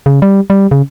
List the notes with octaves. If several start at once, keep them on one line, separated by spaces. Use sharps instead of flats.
C#3
G3
G3
C#3